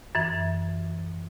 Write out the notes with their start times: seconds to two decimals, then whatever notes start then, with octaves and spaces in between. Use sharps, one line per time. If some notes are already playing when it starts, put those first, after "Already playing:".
0.15 F#2 E3